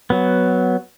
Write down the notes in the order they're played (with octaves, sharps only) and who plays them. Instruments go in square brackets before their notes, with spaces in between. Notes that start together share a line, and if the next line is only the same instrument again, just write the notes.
[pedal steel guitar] F#3 B3